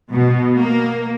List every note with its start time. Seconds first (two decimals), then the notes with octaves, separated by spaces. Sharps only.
0.12 B2
0.59 A#3